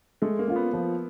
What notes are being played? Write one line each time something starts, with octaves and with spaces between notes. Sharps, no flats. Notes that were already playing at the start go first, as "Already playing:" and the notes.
G#3 A3
A#3
C#4 F4
B3
F3